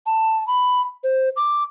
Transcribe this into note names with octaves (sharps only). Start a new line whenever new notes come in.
A5
B5
C5
D6